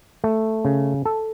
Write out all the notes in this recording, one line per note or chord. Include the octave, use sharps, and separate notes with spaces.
A3
C#3
A4